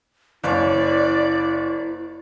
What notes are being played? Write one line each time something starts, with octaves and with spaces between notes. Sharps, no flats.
F#1 E4 C#5 D5